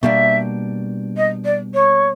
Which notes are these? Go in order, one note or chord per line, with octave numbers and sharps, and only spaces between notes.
B2 G3 A#3 D4 E5
D#5
D5
C#5